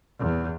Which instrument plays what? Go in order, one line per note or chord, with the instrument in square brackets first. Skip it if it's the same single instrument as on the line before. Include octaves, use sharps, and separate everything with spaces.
[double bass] E2